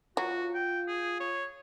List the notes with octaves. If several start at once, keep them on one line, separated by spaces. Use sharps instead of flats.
F#3 F4 F#4
G5
G#4
C#5